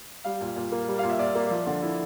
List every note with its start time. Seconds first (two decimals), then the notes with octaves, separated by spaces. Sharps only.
0.24 G3 F5
0.41 A#2
0.56 A#2
0.72 A#3
0.88 G3
0.99 A#2 F5
1.09 E5
1.19 A#2 D5
1.35 A#3
1.50 F3
1.66 D3
1.82 E4